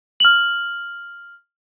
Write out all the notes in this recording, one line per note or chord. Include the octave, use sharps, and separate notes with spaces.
F6 F#7